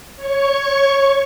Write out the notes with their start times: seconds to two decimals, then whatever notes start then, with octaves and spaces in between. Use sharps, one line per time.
0.16 C#5 C#6